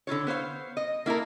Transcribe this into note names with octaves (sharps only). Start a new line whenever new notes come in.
D3 E4 F4 C#5
B3 C5 C#5 F5
D#5
A#3 E4 A4 A#4